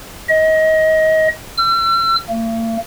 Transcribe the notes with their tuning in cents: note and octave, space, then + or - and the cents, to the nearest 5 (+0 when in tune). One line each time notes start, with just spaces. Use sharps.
D#5 +25
E6 +45
A#3 -45